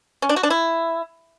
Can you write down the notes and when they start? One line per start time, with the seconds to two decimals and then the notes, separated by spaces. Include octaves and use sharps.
0.22 C#4
0.29 D4
0.36 F#4
0.43 D4
0.50 E4